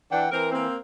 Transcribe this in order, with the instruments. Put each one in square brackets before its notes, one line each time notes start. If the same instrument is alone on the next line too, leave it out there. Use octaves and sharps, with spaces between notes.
[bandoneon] E3 F#5 G5 [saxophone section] D4
[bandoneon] E3 [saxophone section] C4 A#4
[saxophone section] A#3 C4